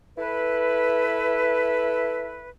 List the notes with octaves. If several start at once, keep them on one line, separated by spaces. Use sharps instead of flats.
E4 A4 B4